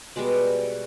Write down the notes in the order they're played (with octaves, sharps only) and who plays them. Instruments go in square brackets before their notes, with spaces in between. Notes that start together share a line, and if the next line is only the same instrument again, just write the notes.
[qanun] B2 G3 G#3 D5